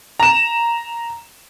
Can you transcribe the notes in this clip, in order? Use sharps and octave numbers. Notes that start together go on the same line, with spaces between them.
A#5 E7